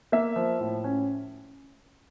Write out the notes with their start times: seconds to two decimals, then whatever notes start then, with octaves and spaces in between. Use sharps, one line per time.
0.12 A#3 E5
0.36 F3
0.60 A2
0.84 C#4